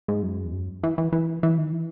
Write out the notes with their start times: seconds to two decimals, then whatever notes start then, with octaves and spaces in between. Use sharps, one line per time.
0.08 G#2
0.23 F#2
0.45 E2
0.53 F#2
0.83 E3
0.98 E3
1.12 E3
1.43 E3
1.58 D#3
1.73 E3